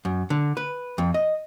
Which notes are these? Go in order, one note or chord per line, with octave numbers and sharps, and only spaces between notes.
F#2
D3
B4
F2
D#5